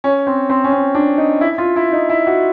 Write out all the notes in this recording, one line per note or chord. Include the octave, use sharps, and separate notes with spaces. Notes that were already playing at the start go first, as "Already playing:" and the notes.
C#4
C4
C4
C#4
C4
D4
D#4
E4
F4
E4
D#4
E4
F#4